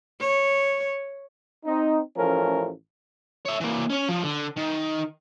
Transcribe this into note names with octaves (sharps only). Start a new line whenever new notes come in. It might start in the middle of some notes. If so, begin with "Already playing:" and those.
C#5
C4 D#4
A1 F3 A3 C#4 A#4
C#5 E5
E3 A#3
C#4 C#5
F3
D3
D#3